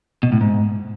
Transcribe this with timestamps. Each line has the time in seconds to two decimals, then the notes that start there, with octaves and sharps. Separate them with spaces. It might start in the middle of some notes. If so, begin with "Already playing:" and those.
0.23 B2
0.32 A2
0.41 G#2